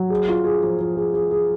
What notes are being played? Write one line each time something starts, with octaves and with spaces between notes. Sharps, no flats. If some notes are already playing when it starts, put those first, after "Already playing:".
Already playing: F#3
G#4
F4
G#4
F3
F3
G#4
G#4
G#4